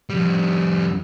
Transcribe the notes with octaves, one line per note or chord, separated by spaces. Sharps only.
F2 G3